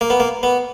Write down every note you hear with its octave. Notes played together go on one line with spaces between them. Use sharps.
A#3
B3
A#3
B3